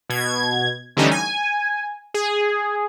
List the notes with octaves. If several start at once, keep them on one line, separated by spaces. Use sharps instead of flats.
B2 G#6
D3 E3 G3 A3 C#4 D#4
G#5
G#4